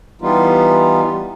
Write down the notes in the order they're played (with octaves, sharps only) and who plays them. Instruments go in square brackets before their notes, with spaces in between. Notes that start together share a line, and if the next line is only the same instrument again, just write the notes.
[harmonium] E3 G3 B3 D#4 F4